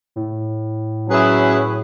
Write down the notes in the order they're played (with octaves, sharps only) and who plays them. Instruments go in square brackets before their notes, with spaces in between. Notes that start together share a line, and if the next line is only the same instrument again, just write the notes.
[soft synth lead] A2
[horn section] F#3 C#4 E4 G#4 B4